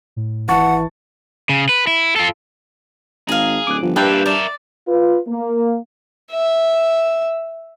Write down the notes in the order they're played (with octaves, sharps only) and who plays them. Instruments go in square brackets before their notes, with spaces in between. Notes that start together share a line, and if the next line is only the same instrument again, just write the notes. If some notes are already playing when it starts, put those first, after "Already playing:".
[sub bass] A2
[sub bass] G#1 [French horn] E3 [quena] F#5 [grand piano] A5 C#6 A6
[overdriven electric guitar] C#3
B4
E4
F4 A4
[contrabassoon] G#1 [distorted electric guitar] G#4 [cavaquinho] F5 A#5
[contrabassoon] D1 [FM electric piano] D6 F#6
[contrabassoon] G1 [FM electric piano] F3
[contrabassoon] G2 [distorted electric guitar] A#3 D4 [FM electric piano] G4 A5 G6 [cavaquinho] B4 E5
[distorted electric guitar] A#4 E5 [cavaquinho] D5
[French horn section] F4 B4
A#3
[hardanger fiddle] E5